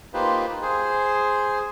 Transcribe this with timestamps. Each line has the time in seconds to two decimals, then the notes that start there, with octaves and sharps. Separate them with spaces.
0.14 A#3 D#4 F4 G4 B4 C5
0.62 G#4 C5